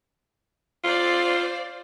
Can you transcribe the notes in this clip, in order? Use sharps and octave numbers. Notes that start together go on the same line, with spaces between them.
F4 C5 D5